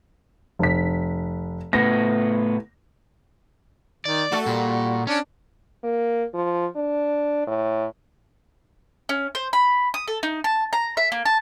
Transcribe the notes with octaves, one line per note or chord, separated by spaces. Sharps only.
F1 B6
A2 B3 A#6
D#3 D5
A3 F#4 A4
A#2 G3
C#4 D4
A#3
F3
D4
A2
C#4
C5
B5
D#6
A4
D#4
A5
A#5
E5
A#3
A5